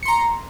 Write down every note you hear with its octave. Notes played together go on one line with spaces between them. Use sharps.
A#5 C6 C#7